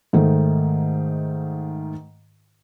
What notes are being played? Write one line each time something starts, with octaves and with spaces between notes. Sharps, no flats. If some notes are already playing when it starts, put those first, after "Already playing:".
G#2 D#3 A3